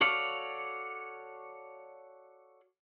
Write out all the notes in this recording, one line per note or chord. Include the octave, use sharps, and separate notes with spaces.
F#4 A4 C#5 D5 F5